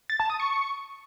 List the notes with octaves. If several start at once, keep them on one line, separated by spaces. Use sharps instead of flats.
A6
A5
D#6
C#6